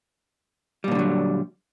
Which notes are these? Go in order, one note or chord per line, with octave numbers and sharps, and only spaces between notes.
A#2 D3 D#3 F#3 G3